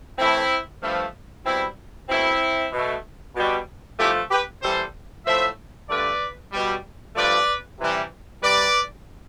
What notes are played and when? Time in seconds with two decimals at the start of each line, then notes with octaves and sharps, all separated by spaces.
0.18 A2 E3 A3 C4 E4
0.82 G2 F3 A3
1.45 B2 G3 C4 E4
2.08 B2 A3 C4 E4
2.72 B2 A3
3.35 B2 G3
3.99 G2 F3 A3 E4 G4
4.30 G4 B4
4.61 C3 E3 G3 A4 C5
5.25 A2 F3 A3 C5 E5
5.89 G2 D3 A3 B4 D5
6.52 B2 G3
7.15 G2 F3 A3 B4 D5
7.79 C3 E3 G3
8.42 C3 G3 B4 D5